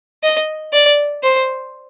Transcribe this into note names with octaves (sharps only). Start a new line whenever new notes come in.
D#5
D5
C5